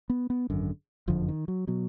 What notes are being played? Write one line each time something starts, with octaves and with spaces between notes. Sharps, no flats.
B3
B3
G#1 F#2 D3
F#1 F2 D3 F3
D#3
F#3
B2 F#3